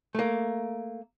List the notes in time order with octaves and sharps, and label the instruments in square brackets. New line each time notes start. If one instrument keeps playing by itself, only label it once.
[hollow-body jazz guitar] A3 A#3